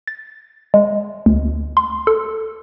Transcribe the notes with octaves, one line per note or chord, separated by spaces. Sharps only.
A6
G#3
D2
C6
A4